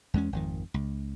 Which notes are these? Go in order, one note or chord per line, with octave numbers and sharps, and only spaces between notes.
E2 G#3 C#4
G#1 F2 D#3
C#2